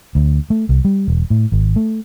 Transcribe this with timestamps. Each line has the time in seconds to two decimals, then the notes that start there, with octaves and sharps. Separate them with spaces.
0.15 D2
0.50 A3
0.69 C2
0.85 G3
1.08 E1
1.30 A2
1.52 G#1
1.76 A3